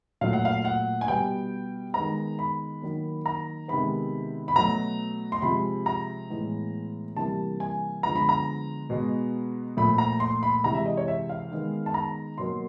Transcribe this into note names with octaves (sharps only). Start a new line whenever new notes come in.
A#2 F#3 A3 F5
F#5
F5
F#5
G#5
B2 G3 B3 G5
D#3 G#3 B3 A#5
B5
D#3 F#3 A#3
A#5
C3 D#3 G#3 B3 B5
B5
B2 F#3 A3 A#5
C6
C3 F3 G#3 B5
A#5
A2 E3 G#3 B3
C3 E3 G3 A#3 A5
G#5
D3 F3 G#3 B3 A#5
B5
A#5
B2 G#3 B3
A#2 F3 A3 B5
A#5
C6
B5
C3 E3 G#3 A#5
E5
D#5
C#5
E5
F5
D#3 G#3 B3
A5
A#5
B2 F#3 A#3 C6